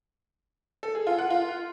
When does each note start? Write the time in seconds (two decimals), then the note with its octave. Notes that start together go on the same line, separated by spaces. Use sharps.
0.83 A4
0.95 G#4
1.07 F4
1.19 F#5
1.30 F4